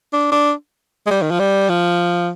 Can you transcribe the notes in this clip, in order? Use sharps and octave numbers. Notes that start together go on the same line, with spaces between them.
D4
D4
G#3
G3
D#3
F3
G3
F3